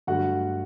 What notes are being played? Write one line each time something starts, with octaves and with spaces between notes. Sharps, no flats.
G2 D3 F#3 A3 F#4 F#5